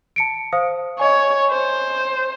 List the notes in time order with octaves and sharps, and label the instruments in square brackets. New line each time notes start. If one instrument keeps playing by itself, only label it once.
[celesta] A5 C#7 D7
C5 F5 D#6
[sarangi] C#5 [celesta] D#5 G#5
[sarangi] C5